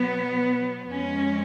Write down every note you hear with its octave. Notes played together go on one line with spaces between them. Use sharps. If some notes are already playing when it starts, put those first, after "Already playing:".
Already playing: B2 F#3 B3
F2 F3 G#3 C#4